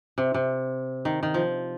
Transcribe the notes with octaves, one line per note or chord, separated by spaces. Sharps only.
C3
C3
D#3
D#3
F3